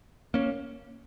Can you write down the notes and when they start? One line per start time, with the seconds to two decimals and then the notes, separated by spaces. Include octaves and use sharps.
0.34 A#3 C#4